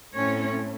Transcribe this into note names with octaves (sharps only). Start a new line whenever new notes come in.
A2 A3 C4 C#4 C#5